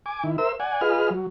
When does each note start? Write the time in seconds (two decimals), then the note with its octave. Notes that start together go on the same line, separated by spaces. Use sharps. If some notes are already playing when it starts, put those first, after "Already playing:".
0.06 G#5 D6
0.24 D#3 E4
0.38 A#4 C5 E5 E6
0.60 D5 F#5 G#5
0.81 F4 G#4 B4 D#5 F6
1.10 F#3